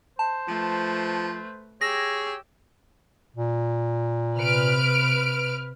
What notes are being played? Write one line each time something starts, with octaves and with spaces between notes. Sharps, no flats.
C5 A5
F3 A3 B4
G4 G#4 C#5 E6 A#6
A#2
C3 B4 F6 D7